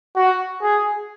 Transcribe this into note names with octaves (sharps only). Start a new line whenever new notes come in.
F#4
G#4